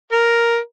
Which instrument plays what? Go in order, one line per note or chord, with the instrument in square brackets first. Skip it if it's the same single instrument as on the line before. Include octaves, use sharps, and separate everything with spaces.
[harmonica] A#4